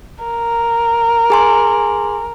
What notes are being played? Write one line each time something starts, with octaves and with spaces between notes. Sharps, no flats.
A#4
G#4 G#5 C6